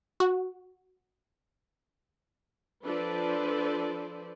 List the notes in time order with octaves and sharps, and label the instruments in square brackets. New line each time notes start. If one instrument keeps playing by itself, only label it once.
[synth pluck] F#4
[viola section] F3 D4 A4 B4 C5 D5